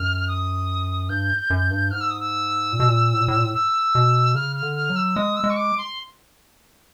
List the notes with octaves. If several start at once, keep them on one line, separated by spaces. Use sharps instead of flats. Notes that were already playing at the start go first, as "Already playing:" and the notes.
Already playing: F#2 F6
D#6
G2 G6
F#2
G2
G#2 F6
E6
D#6
E6
A#2
B2
A#2
A2
A#2
A2
A#2
A2
E6
B2
C#3 F6
F6
D3
F6
F#3
E6
G#3 D#6
E6
G#3
C#6
D6
C6